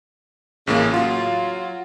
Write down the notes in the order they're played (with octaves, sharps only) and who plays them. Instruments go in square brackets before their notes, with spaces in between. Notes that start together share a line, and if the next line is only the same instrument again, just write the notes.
[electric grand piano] A1 A2 A#3 [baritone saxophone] C#3
[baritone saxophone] F#3 [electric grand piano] F4